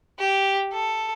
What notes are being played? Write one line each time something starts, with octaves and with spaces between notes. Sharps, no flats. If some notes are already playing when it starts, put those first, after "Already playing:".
G4
A4